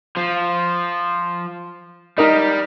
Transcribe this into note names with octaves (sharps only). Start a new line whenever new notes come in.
F3
G3 D#4 A#4 D#5